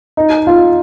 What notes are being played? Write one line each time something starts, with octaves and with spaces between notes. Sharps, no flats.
D#4
F4